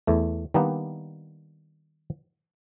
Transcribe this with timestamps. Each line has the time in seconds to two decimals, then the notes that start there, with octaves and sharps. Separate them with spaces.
0.07 E2 A3
0.54 D#3 G3 A#3 B3 D4 D#4